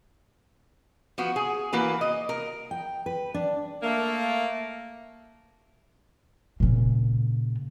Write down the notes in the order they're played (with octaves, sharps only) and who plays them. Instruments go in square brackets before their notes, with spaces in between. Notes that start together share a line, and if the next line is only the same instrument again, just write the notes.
[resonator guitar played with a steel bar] F3 B3 F#4
G#4
E3 A#3 F#4 B4
D#5
A#4
[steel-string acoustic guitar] G5
B4
D4
[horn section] A3 A#3
[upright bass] A#2 C#3